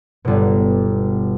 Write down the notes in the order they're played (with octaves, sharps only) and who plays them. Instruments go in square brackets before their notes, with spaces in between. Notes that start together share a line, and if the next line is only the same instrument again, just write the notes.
[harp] G1 B2